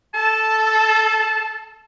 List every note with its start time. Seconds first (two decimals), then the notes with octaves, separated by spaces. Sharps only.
0.14 A4 A5